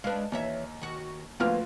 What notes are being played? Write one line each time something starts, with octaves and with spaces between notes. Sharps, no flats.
G#3 D4 B4 F5
D#2 E3 C#5 E5
D#3 F#4
D2 F3 A#3 F4 B4 F6